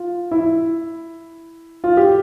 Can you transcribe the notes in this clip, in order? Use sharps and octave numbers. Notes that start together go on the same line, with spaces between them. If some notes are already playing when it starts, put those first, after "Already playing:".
Already playing: F4
E4
F4
G4